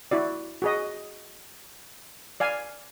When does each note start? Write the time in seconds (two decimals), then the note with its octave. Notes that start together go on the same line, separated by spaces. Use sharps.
0.11 E4 F#4 D5
0.62 F#4 G#4 D#5
2.40 D5 F5 G#5